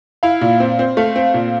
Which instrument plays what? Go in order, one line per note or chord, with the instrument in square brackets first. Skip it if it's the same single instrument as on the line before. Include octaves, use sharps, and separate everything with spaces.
[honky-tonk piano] E4 [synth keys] F5
[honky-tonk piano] A#2
C4
C4
[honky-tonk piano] A3 [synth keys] F5
[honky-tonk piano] C4
A#2